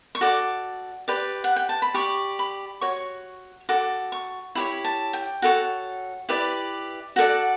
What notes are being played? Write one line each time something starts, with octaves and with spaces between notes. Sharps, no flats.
C#6
F#4 A4 D5 D6
G4 B4 D5
F#5
G5
A5
B5
G4 D5 C#6
B5
F#4 C#5 C#6
F#4 A4 D6
C#6
E4 G4 C#5 B5
A5
G5
F#4 A4 C#5
E4 G4 B4 D5
F#4 A4 D5 F#5